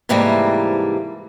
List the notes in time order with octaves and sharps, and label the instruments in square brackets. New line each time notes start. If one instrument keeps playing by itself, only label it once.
[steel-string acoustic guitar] G#2 C3 E3 G3 A3 A#3